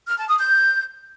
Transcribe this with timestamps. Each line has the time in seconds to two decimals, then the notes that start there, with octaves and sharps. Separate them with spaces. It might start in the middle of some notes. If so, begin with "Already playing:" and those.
0.07 F6
0.18 A5
0.28 D#6
0.38 G6